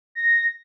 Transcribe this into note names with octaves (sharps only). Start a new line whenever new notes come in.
A#6